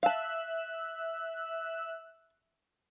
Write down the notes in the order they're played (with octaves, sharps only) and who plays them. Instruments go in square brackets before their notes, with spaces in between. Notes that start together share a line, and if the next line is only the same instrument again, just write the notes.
[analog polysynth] E5 E6 F#6 [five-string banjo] F5 A5